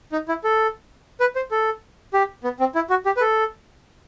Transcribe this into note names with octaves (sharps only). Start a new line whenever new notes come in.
D#4
E4
A4
B4
C5
A4
G4
B3
C4
E4
F#4
G4
B4
A4